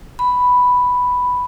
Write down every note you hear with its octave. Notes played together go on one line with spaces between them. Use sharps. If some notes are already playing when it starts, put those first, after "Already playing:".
B5